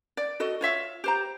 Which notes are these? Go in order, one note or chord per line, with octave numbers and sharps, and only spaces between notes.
D5
F#4 A4 D#5
F4 C#5 E5 F5
G4 C5 A#5